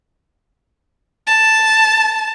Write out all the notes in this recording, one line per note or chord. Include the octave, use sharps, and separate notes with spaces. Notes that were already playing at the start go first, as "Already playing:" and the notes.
A5